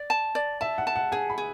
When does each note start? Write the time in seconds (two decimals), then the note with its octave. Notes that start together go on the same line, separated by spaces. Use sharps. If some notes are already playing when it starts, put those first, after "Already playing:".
Already playing: D5
0.10 A5
0.35 D5
0.61 E5 A5
0.78 F#5
0.87 A5
0.96 F#5
1.12 G#4 G#5
1.30 B5
1.38 G#4